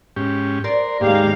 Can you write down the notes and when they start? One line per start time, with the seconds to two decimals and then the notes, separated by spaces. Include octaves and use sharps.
0.16 G#2 C#4 G4
0.64 A#4 D5 C6
1.01 D#2 G#2 G#3 A#3 G4 F5